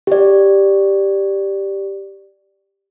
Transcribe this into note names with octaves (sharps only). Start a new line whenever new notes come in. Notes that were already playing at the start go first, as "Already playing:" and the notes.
G4 D5